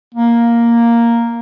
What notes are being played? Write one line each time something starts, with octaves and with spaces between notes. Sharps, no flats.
A#3